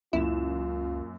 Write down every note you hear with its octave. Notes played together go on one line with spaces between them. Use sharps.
C#2 F#2 A#2 E4 F4 E7